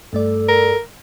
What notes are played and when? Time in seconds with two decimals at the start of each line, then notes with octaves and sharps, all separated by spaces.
0.13 G2 A3 A4 D5
0.48 A#4